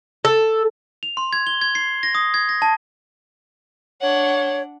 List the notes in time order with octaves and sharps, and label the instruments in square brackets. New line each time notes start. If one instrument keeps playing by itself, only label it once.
[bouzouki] A4
[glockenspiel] F7
C6
G#6
G7
G#6
C7
A#6
D#6
G#6
A#6
A5
[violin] D4 F#5 [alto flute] C#5